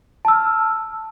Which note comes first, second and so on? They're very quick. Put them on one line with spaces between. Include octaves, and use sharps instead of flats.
A5 E6 F6